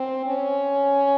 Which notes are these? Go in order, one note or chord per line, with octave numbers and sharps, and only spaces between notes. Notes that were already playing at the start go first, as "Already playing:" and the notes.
Already playing: C4
C#4